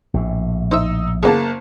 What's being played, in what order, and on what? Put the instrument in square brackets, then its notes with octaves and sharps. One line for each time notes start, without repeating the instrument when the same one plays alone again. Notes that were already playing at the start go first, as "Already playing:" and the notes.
[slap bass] A#1 A2
[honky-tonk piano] D#4 D#6 E6 [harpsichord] C5 E5
[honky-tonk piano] F#1 A#3 A5 [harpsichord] C#2 B3 G#4